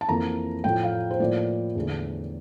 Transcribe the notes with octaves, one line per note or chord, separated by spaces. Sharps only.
A5
F2 E3 A#3 A#5
A2 F3 A3 G5
F5
C5
A2 F3 A#3 D5
E2 D3 A3